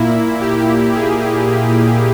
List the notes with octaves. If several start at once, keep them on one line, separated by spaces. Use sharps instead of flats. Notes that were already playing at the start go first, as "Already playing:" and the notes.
Already playing: A#2 A#3 E4
G4
E4 G#4